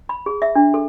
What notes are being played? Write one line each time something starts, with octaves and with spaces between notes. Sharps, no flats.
B5
G#4
E5
D4
A4